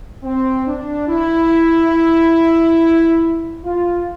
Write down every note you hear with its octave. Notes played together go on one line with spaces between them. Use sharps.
C4
D4
E4
F4